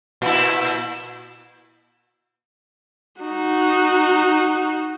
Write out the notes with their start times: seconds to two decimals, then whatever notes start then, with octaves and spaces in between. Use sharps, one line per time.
0.22 A#2 E4
3.22 D#4 F#4